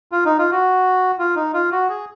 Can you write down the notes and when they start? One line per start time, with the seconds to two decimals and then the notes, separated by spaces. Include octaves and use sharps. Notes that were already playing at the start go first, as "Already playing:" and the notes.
0.12 F4
0.25 D#4
0.38 F4
0.52 F#4
1.19 F4
1.36 D#4
1.54 F4
1.72 F#4
1.89 G#4